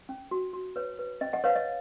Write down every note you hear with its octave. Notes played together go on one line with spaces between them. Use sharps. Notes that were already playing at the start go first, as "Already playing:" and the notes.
C#4
F#4
F#4
B4 C#5
B4
C#4 D#5
D#5 F#5
B4 C#5 F5
D#5